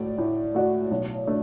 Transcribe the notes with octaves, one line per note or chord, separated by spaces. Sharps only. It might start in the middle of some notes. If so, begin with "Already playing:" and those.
Already playing: A2 A3 F#4 D5
A2
A3 F#4 D5
B1
A3 D4